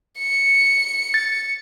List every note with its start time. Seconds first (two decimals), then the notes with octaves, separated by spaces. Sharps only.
0.18 C#7
1.14 A6